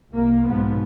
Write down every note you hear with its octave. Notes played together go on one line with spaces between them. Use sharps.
C2 A#3
B1 G#2 F3 B3